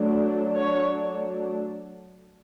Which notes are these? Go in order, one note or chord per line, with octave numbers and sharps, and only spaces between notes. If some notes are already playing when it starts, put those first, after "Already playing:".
Already playing: F#3 A3 D4
C#5